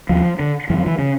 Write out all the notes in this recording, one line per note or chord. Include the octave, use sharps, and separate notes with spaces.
D#2 F3
D3
F#2 E3
F3
E3
C#3